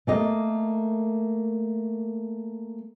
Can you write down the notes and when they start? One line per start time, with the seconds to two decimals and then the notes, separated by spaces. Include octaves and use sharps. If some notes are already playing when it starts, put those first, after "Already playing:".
0.07 A3 A#3 D#5